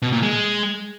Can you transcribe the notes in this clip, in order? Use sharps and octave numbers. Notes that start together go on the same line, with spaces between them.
B2
A#2
G#3